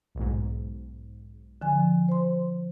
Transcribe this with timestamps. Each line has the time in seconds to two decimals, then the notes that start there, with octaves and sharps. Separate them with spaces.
0.15 B1 G#2
1.61 D3 F3 G#5
2.09 C5 C6